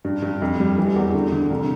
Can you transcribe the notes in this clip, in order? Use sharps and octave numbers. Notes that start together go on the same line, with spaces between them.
G2
G2
F2
G3
E3
E2
D3
D3
C2